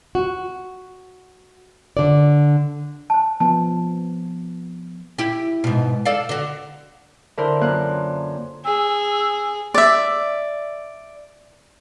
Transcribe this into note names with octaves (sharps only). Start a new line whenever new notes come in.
F#4
D3 D5
C5 A5
F3 B3 A5
E4 G4
G#2 B2
A4 D5 F5
D3 F#4
D3 E4 A#4 C5
F#2 A#3 F4 F#6
G#4 E6
D5 E5